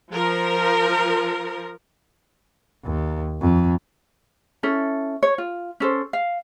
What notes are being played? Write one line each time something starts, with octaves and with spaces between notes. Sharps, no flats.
F3 A#4
D#2
F2
C#4 E4 A4
C#5
F4
C#4 A4 C5
F5